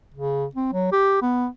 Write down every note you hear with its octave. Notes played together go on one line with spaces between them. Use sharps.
C#3
C4
F#3
G4
B3